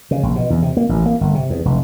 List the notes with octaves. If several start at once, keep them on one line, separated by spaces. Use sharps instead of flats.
C#3
A#1
B2
E2
C3
A#3
A1
A#3
G1
C3
E2
F1